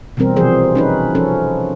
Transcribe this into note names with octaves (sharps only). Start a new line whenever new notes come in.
B2 E3 G3 C4 A#4
C3 E3 F3 G#4 C5
C#4 D#4 B4
F3 C#4 A4